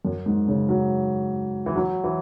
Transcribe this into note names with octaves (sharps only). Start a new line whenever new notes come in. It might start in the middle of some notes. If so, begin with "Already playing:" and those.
F#2
G#2
C#3
F#3
E3
F#3
E3